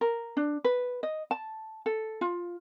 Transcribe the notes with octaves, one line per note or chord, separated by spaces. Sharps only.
A#4
D4
B4
D#5
A5
A4
F4